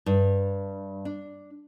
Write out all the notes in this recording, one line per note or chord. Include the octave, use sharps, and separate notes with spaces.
G2
D4